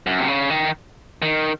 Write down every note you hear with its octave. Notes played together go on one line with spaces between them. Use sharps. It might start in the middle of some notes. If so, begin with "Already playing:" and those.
F#2
C3
C#3
D#3
D#3